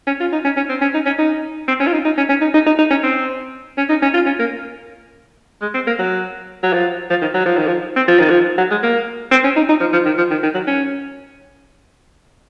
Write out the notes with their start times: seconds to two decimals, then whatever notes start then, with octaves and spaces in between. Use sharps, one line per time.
0.07 C#4
0.20 F4
0.33 D#4
0.45 C#4
0.57 C#4
0.69 C4
0.81 C#4
0.94 D#4
1.06 C#4
1.19 D#4
1.68 C4
1.80 C#4
1.87 F4
1.93 D#4
2.05 D#4
2.18 C#4
2.29 C#4
2.41 D#4
2.54 D#4
2.66 D#4
2.79 D#4
2.90 C#4
3.03 C4
3.78 C#4
3.89 D#4
4.02 C#4
4.14 F4
4.26 C#4
4.39 A#3
5.62 G#3
5.74 C4
5.87 A#3
5.99 F#3
6.63 F#3
6.73 F3
7.10 F3
7.22 D#3
7.34 F#3
7.46 F3
7.57 D#3
7.67 F3
7.96 C4
8.08 F3
8.19 D#3
8.30 F3
8.58 F#3
8.71 G#3
8.83 A#3
9.31 C4
9.44 C#4
9.56 D#4
9.69 D#4
9.80 F3
9.93 F3
10.05 D#3
10.18 F3
10.31 D#3
10.43 D#3
10.54 F#3
10.67 C#4